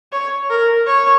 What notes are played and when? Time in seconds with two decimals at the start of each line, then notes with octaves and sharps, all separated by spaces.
0.13 C#5
0.50 A#4
0.87 C#5